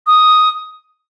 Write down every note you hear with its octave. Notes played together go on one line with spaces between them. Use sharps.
D#6